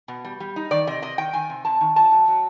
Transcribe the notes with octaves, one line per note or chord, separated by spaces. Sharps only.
B2
G3
G3
D#4
D#3 D5
C3 D#5
C3 D#5
D#3 G5
D#3 G#5
C3
C3 A5
D#3
F#3 A5
F#3
F#3